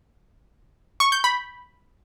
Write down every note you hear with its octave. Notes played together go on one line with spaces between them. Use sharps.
C#6
G6
B5